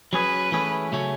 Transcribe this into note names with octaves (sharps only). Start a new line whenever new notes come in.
F#3 C#4 G#4 B4
E3 A3 C#4 G#4
C#3 F#3 A3 C#4